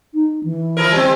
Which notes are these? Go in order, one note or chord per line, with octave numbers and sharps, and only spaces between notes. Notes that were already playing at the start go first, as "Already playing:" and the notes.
D#4
E3
F3 E4 A#4
G3 C4